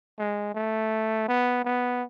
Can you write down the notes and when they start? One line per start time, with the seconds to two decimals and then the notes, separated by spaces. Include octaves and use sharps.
0.19 G#3
0.55 A3
1.28 B3
1.65 B3